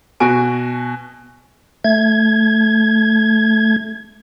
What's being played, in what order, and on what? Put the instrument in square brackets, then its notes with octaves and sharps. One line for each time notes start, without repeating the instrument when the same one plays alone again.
[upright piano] B2 F#4 G#5 D7
[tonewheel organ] A3 G#6